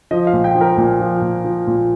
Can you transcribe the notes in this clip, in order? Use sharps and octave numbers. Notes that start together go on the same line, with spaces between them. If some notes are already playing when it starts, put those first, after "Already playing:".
F3 D#5
F5
A#2
G5
F3
A#4
A#2
F3
A#2
F3
A#2